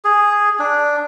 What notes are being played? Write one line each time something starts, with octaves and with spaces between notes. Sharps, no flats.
G#4
D4